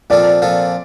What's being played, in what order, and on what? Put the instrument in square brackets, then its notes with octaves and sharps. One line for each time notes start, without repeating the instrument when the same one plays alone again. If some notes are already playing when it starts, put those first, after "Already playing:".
[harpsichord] A#2 F3 C4 F4 A4 [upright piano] D5
[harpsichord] A#2 F3 C4 F4 A4